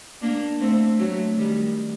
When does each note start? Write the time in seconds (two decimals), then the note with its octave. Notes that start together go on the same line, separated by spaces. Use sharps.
0.21 A#3 D4
0.60 A3 C4
0.99 F#3 A3
1.37 D#3 G3